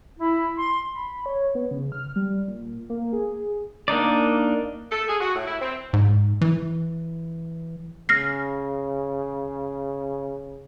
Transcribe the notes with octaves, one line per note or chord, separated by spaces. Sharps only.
E4
C6
B5
C#5
B3
C#3
F6
G3
A#2
A#3
G#4
A#3 D4 D#4 D5
A4
G#4
F#4
A2
E4
C4
G#2
E3
C#3 F6 A#6 C7